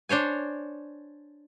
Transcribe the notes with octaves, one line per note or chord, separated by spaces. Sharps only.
D4 C5 C#5 G#5